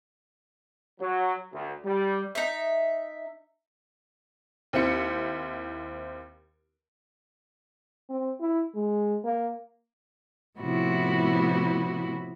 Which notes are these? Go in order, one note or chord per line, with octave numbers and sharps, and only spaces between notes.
F#3
D2
G3
D#4 E5
D#2 C4 E4 C#7
C4
E4
G#3
A#3
A2 C3 F3 B3 E4 F#4